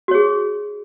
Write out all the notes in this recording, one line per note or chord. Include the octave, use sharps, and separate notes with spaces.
F#4 G#4 C#5